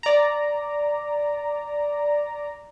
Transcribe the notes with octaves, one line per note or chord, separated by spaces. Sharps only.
D5 A#5